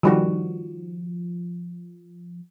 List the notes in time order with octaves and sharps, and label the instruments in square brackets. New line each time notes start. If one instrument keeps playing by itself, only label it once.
[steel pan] D#3 G3 F#4 [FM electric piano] F3